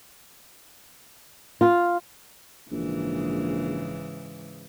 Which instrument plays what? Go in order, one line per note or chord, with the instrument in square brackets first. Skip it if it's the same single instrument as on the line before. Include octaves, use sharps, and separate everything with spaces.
[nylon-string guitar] F4
[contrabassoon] A#1 [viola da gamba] G#2 C#3 E3